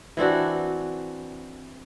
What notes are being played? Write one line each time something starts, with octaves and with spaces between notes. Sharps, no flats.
E3 C4 D4 F#4